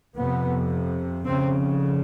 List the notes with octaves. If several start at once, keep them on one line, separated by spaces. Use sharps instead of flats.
F2 C3 B3
F2 C#3 C4